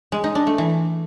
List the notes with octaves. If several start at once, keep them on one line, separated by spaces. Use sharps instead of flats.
G#3
D#4
D4
A3
E3